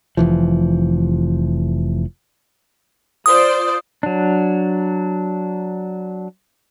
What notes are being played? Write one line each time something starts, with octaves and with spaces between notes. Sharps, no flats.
F1 E3 F3
F4 C5 D5 D#6
F#3 D4